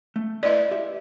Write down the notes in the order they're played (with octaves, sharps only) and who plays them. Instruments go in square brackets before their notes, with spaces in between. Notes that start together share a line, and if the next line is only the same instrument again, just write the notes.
[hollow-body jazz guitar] A3
[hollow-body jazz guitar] E4 B4 [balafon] D5 D#5
[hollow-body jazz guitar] G4 E5